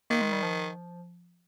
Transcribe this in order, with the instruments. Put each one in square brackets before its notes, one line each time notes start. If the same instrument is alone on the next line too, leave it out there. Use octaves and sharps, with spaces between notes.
[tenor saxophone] D#3 [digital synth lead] A#3
[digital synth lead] G#3
G3
F3